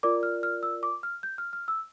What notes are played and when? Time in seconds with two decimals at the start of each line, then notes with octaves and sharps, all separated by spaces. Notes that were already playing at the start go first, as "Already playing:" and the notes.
0.03 F4 A#4 D5 D6
0.23 F6
0.43 F6
0.63 E6
0.83 D6
1.03 F6
1.23 G6
1.38 F6
1.53 F6
1.68 E6